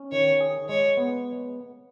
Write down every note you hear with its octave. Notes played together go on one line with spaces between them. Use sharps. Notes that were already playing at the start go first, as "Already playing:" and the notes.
Already playing: C#4
D#3 C#5
G#4
G#3 C#5
B3